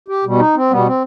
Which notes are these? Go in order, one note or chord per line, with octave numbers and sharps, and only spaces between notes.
G4
B2 G3
D#4
C4
B2 G3 B3
C4